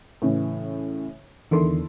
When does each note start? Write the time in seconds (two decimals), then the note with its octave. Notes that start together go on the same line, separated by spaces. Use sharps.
0.22 A2 C#3 E3
1.51 E2 D3 D#3 E4 A4 C6